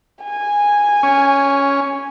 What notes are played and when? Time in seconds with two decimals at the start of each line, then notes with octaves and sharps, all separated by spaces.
0.23 G#5
1.03 C#4